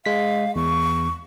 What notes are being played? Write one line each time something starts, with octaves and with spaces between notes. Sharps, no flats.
G#3 F5 B6
E2 C#6